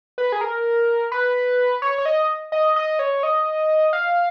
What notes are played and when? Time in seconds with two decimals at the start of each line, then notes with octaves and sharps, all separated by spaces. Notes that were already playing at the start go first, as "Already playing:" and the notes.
0.18 B4
0.32 G#4
0.41 A#4
1.12 B4
1.82 C#5
1.98 C#5
2.06 D#5
2.52 D#5
2.76 D#5
2.99 C#5
3.23 D#5
3.93 F5